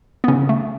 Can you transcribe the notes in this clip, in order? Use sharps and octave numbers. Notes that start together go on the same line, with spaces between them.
B3
C#3 C#4
A3